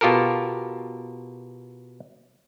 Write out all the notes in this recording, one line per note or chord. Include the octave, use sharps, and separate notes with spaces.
B2 F4 G4 A4 A#4